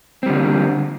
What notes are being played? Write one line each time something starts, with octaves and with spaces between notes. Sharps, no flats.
D3 G3 A#3 C4